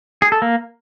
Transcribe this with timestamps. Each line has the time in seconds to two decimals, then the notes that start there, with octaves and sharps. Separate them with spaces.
0.22 G#4
0.32 A4
0.42 A#3